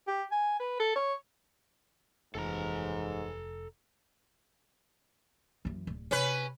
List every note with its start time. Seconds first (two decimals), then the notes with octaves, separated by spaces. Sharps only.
0.07 G4
0.32 G#5
0.60 B4
0.79 A4
0.96 C#5
2.35 F1 D#2 G#2 E3 A4 A5 A#5
5.65 F#2 E3
5.87 D1
6.11 C3 C#4 B4